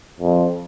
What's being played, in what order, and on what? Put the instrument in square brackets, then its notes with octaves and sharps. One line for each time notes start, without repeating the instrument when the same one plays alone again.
[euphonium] F2